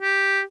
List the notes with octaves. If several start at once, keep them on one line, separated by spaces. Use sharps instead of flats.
G4